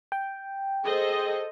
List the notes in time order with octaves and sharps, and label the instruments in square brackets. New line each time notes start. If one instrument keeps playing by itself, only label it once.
[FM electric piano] G5
[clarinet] G#4 [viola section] A4 C5 D#5